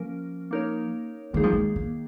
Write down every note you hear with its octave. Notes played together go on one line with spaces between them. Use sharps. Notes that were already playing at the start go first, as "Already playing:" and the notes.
Already playing: F3 A#3 C#4 A#4
A#3 D#4 A#4 C#5
D#3 G#3 A#3 D#4 G#4
F3
G#3
A#3